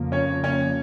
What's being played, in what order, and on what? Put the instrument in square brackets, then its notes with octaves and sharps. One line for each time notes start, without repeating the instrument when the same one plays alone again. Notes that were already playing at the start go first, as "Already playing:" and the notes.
Already playing: [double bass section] F2 C#3 F3 A#3
[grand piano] C#4 C#5
C#4 C#5